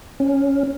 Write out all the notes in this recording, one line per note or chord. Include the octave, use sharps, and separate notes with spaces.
C#4